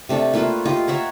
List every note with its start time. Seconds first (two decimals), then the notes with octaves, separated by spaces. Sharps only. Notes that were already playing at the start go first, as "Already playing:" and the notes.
0.09 C3 A3 D4 A4
0.34 A3 A#3 F4 B4
0.65 F4 G4 D#5
0.88 C#5 E5 F#5 A#5